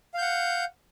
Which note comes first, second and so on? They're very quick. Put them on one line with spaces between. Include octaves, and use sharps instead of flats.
F5 G6 F#5